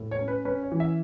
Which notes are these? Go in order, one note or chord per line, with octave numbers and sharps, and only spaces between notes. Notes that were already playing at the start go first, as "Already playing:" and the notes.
Already playing: A2
C#5
C#4
B4
C#4 B4
C#5
E3
E5